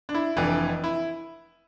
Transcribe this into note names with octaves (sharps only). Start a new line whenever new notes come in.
D4
E4
F1 F2 E3 D4
E4